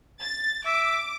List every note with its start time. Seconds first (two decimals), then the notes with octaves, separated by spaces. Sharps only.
0.21 A6
0.66 E5 D6